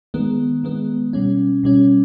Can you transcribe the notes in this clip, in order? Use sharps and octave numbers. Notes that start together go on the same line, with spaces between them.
D#3 G#3 B3
D#3 G#3 B3
B2 G3 C#4
B2 G3 C#4